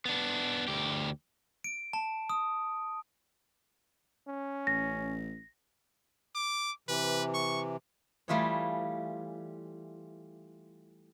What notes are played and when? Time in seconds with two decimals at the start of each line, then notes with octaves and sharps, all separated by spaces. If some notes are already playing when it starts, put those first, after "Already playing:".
0.05 B3 D4
0.68 D2 G4
1.64 D7
1.93 A5
2.29 D#6
4.28 C#4
4.67 A1 A#6
6.35 D6
6.89 C3 E3 B4
7.34 C#6
8.28 E3 G3 A3 F4 G#4 C#5